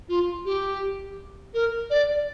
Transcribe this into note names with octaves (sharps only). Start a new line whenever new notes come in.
F4
G4
A#4
D5